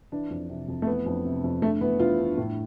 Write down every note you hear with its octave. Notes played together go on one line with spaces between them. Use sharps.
E3 D4
F2
C3
F2
A3
E3 B3
F2
C3
F2
G2 A3
E3 B3
E3 F4
G2
A2